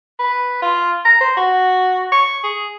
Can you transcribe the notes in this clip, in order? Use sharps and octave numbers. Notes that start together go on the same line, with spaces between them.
B4
F4
A#5
C5
F#4
C#6
G#4